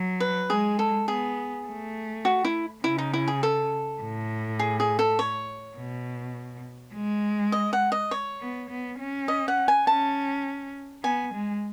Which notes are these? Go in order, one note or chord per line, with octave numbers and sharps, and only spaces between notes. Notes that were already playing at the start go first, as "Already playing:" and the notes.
Already playing: F#3
B4
G#3 G#4
A4
B3 G#4
A3
F#4
E4
C#3 E4
D#4
E4
G#4
A4
A2
G#4
G#4
A4
C#5
B2
G#3
D#5
F#5
D#5
C#5
B3
B3
C#4
D#5
F#5
G#5
C#4 A5
B3 G#5
G#3